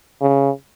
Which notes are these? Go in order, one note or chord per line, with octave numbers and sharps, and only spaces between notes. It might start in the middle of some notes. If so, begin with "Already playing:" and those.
C#3